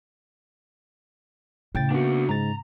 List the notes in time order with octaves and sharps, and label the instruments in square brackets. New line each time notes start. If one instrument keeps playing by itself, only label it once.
[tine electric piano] A2 G5 A6 [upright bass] C#3
[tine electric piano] A#3 B3 [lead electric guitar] D4 F#4
[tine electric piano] G#2 G#3 A6 [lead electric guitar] A#5